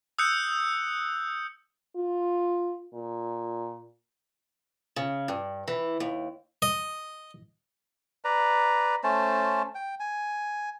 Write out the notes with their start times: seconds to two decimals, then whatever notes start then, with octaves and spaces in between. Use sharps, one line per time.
0.18 D#6 E6 F#6 G6 C#7
1.96 F4
2.93 A#2
4.96 C#3
5.28 G2
5.68 E3
6.00 D#2
6.62 D#5
8.24 B4 D5 A#5
9.04 A3 C#4 C5 A5
9.75 G5
10.00 G#5